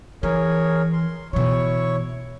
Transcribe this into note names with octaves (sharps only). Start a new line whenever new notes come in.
E3 G#4 A#4 C#5
C6
B2 E3 E4 C#5 C#6